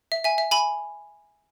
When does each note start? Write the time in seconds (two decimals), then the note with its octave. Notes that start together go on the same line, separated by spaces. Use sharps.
0.12 E5
0.24 E5 G#5
0.38 E5
0.51 G#5 B5